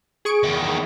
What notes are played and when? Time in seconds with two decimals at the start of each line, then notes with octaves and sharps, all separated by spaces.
0.25 G#4 C#6 D7
0.43 E2 D#3